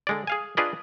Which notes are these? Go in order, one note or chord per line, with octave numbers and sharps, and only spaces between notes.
D3 G#3 D5
G#4 F5 G#5
D4 F4 G#4 B4 D5 D#5